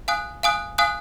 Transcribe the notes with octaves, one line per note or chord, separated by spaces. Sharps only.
F5 G#5 D#6 F#6
F5 G#5 D#6 F#6
F5 G#5 D#6 F#6